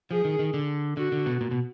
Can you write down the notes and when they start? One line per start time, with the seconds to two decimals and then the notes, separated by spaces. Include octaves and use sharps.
0.11 F3 G#4
0.25 D#3
0.39 D#3
0.54 D3
0.97 D3 F#4
1.12 D3
1.26 B2
1.41 A#2
1.51 B2